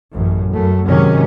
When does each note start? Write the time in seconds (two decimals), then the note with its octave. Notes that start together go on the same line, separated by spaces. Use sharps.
0.12 A1 F#2
0.51 F#2 A3
0.86 G#2 C3 D#3 F#3 C#4